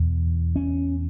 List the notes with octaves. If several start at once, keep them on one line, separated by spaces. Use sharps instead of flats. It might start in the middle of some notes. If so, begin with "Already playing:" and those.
Already playing: E2 B2
C#4